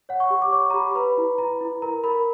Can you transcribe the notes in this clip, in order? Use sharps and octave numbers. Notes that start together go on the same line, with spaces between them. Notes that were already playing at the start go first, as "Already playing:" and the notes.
C#5 F#5
C#6
G4 C#6
D6
C#5 C#6
A#5
G4 B5
A#5
B4 B5
E4
E4 A#5
E4
A#4 A#5
A#4 B5